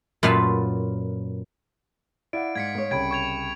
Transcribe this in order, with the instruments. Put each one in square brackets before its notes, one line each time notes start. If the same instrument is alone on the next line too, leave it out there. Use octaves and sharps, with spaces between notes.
[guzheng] F#2 A#2 F4 B4 F5 A5
[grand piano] E4 [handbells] D5 F5 F#5 [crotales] D7
[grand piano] G#2 [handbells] F5 [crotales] G#6 B6 C#7
[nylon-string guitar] B3 C#5
[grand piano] C2 C#3 [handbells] G5 B5 [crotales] G#6 D7
[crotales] C#6 G#6 F7